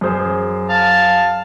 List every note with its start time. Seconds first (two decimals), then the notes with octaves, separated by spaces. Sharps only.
0.01 F#2 G#4 C5
0.70 F5 A5